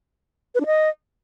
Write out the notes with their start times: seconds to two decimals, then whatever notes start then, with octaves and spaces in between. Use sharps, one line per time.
0.55 B4
0.60 D4
0.66 D#5